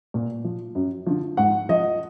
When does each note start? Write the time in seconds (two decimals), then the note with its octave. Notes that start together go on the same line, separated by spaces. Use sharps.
0.14 A#2
0.44 F3
0.75 F#2
1.06 D3 F3
1.37 G#2 F#5
1.69 F3 D#5